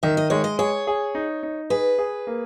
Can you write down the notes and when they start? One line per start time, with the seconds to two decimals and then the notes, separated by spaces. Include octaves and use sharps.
0.03 D#3 E5
0.17 D#5
0.30 G#3 C#5
0.44 D#5
0.59 G#4 C#5
0.87 G#4
1.15 D#4
1.43 D#4
1.70 G#4 B4
1.98 G#4
2.27 A#3